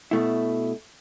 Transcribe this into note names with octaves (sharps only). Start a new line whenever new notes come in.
B2 A3 E4